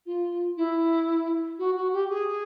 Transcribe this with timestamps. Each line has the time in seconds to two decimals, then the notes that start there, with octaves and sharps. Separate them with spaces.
0.06 F4
0.56 E4
1.58 F#4
1.75 F#4
1.92 G4
2.09 G#4